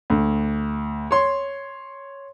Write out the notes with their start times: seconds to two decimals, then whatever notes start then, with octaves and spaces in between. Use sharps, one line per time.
0.10 D2
1.11 C#5 C6